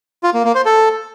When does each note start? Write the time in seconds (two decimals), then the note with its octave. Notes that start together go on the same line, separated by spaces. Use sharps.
0.23 F4
0.34 A#3
0.44 A#3
0.55 C5
0.65 A4